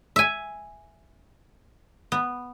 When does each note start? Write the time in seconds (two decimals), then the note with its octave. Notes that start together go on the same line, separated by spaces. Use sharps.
0.16 E5 G#5
2.12 B3